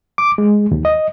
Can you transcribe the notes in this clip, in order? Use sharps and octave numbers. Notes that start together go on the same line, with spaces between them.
D6
G#3
D#2
D#5